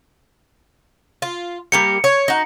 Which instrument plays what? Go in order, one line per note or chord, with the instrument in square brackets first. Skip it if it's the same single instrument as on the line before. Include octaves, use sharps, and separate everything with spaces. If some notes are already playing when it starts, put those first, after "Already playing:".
[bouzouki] F4
[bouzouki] G3 A#3 G4 [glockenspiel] C#7
[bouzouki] C#5
D#4 F#4